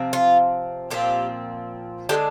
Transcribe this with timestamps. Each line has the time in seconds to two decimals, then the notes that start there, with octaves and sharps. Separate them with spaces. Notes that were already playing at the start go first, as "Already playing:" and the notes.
Already playing: C3 F3 C4
0.13 F4
0.91 A#2 F3 C4 G4
2.09 D3 G#3 D4 G4